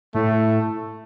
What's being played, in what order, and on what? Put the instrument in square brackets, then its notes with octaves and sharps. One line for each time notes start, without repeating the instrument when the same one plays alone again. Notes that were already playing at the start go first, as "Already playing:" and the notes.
[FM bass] A2 [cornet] A3